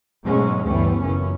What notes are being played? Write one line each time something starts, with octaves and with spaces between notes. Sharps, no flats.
G#2 B2 F#3 G#3 A3 C#4
D2 G2 E3 G3 B3 C#4
F#1 F#2 A#2 E3 C#4